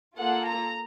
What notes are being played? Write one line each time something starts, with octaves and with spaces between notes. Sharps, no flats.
A#3 F4 A4 F#5
A#5